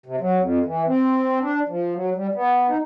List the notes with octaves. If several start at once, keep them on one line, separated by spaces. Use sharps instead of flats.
C3
F#3
F2
E3
C4
D4
F3
F#3
G3
B3
D#4